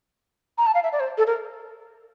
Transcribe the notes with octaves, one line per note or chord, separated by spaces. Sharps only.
A#5
A5
F5
E5
D5
C5
A4
A#4